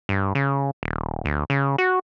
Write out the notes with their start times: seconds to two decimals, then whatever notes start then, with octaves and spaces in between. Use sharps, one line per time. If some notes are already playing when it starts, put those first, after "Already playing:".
0.09 G2
0.35 C#3
0.83 D#1
1.25 D2
1.50 C#3
1.78 F#4